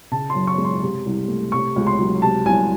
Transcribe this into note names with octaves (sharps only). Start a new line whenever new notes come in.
C#3 A5
C6
F#2
C#6
G#3
C6
C3
C2
A3
C3 C#6
C#2
C6
F#3
C3 A5
C2 G#5